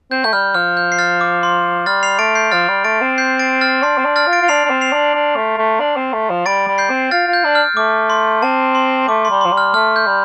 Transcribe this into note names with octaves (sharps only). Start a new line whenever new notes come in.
C4 G6
A3 G6
G3 F6
F3 F6
G6
C7
F6 A6
D6
C6
G3 F6 A6
C7 F7
A3 A6 D7
G6 C7
F3 F6 A6
G3
A3 A6 D7
C4
G6 C7
A6 D7
F6 A6
D4 C6
C4
D4
F6 A6
F4
A6 D7
F4
D4 C7 F7
D4
C4
C7 F7
D4
D4
A3
A3
D4
C4
A3
F3
G3 A6 D7
G3
G6 C7
C4
F4 F6 A6
F4
G6
D4
F6
A3 D6
C6
C4 A5
C6
A3 D6
C6
G3
F3 C6
G3
F6
A3 F6
G6
G3